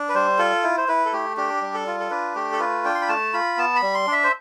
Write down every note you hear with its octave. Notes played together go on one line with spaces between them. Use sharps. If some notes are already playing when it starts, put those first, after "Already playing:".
Already playing: D4
B4
G3 C5
F4 A4
E4
C5
E4 B4
A4
A3 G4
D4 G4
G3
A4
F4
A4
D4 B4
A3 G4
A4
F4 B4
D4 G5
C6
B5
A3 A5
F4 B5
B3 A5
B5
G3
C6
D4
E5
C5